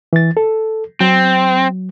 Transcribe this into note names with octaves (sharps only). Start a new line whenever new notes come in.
E3 A6
A4
F#3 C4